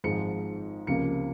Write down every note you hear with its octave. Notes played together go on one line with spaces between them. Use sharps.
G#1 G#2 F3 G#3 C#7
C#2 C3 F3 A#3 C#7